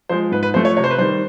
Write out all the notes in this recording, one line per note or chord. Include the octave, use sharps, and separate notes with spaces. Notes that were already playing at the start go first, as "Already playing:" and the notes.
F3 G#3 C5
G#2 B4
B4
F3 A3 C5
C#5
C3 C#5
C5
B4
D#3 G3 C5